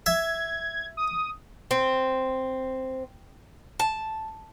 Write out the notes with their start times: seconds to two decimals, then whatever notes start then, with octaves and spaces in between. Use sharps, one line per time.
0.06 E5 G#6
0.97 D#6
1.71 C4
3.80 A5